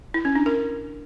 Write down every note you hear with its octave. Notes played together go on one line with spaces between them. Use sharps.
E4
C#4
D4
A#4